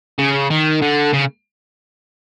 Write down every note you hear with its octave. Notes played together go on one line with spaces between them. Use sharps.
C#3
D#3
D3
C#3